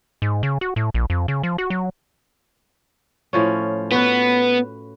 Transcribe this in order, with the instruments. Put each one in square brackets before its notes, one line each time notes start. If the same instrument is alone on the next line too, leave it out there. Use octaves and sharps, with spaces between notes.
[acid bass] G#2
C#3
F#4
A2
A#1
F2
C#3
F3
F#4
F#3
[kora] A2 F3 C#4
[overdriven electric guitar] B3 [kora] F#4 B4